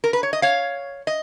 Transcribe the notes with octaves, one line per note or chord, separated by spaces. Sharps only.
A#4
B4
C#5
D#5
C#5 F5
D#5